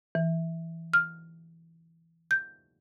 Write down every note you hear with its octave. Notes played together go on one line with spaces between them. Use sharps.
E3
F6
G6